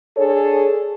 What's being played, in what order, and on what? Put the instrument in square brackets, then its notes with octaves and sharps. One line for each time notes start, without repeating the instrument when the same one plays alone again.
[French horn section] D4 G#4 A4 C#5